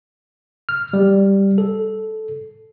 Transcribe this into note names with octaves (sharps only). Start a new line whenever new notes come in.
F6
G3
A4